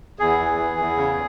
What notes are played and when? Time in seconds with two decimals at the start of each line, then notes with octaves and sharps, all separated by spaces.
0.19 E2 G#4
0.39 E3
0.58 E2
0.78 E2
0.97 C#3